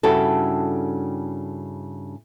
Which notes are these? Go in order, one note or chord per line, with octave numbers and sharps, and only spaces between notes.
G2 C#3 E4 F#4 G4 A4